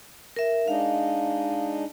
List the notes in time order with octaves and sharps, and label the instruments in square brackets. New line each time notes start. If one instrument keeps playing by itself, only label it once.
[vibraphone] A#4 E5
[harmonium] G#3 D4 D#4 [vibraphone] F5